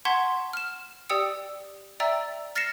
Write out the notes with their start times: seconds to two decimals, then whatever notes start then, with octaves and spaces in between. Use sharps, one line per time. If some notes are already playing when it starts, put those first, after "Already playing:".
0.05 F#5 A5 C6 C#6 G#6 B6
0.53 F6 E7
1.09 G4 D5 G5 D#6 E6 C#7
2.00 D5 E5 G5 A#5 E6 A6
2.56 F6 A6 A#6 C7 C#7 E7